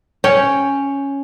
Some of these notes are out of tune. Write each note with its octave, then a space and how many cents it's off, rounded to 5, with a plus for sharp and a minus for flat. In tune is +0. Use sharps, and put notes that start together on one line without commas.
C#4 +0 G5 +5